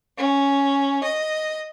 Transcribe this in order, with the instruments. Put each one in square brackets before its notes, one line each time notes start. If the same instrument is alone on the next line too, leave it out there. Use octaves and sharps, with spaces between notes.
[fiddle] C#4
D#5